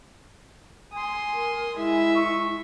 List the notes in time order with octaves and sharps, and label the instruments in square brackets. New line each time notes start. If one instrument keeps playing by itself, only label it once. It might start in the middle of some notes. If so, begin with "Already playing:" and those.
[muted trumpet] G#5 [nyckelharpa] C6 D#6
[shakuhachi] A#4
[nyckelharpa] G#3 E5 [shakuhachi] E4
[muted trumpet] C#6